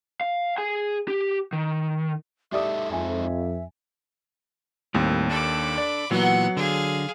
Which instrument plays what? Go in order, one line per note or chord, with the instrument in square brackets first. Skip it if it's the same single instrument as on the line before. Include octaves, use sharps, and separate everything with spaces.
[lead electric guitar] F5
G#4 G#5
G4
D#3
[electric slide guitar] G#3 D#4 A4 [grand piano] G4 D5 D#6 [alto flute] E5
[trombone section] F2 [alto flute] E5 [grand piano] G#5
[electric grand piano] D#2 [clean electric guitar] A2 G3 C4
[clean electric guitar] D4 A4 [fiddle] B5 D6
[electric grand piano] D5
[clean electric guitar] A#2 E3 [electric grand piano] F#3 [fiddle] B3 F#5
[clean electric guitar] D3 [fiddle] G#4 F5